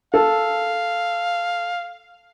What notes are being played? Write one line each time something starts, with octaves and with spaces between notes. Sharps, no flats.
A4 F5